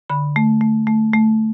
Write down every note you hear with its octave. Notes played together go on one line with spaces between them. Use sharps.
D3 B5
A3
A3
A3
A3